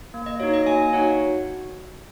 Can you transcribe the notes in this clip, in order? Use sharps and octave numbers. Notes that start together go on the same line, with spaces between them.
A#3
D#5
D#4 F#4 C#5
D#5
A#3 D#5 G#5
D#4 F#4 C#5 F#5